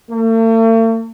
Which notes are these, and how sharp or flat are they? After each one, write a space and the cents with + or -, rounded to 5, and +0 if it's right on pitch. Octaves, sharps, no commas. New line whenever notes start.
A3 +45